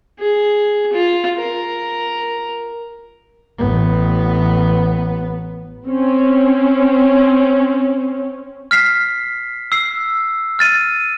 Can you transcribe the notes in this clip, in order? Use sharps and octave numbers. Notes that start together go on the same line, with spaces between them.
G#4
F4
A#4
A1 B3
C4 C#4
F6 B6 C7
E6 C7
F6 A6 D#7